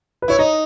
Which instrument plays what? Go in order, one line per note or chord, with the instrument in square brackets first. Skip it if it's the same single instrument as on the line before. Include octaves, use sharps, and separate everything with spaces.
[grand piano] B4
[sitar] E4 [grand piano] C#5
[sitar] D#4 [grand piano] D#5